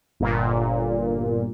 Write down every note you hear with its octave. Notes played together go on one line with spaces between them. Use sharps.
G1 A#2